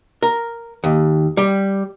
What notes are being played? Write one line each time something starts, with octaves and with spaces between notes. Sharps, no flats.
A#4
D#2
G3